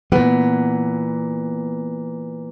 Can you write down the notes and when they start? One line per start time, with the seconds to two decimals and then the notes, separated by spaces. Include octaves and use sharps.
0.12 A#2 E3 B3